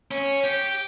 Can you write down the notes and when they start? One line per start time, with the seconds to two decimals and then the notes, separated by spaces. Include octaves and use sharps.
0.11 C#4
0.44 G4